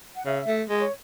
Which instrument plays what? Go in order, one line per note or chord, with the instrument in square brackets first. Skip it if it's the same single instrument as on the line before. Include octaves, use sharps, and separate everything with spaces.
[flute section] F#5
[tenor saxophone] C#3 [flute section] E5
[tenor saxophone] A3
[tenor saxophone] G#3 [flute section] D#5
[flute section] C#5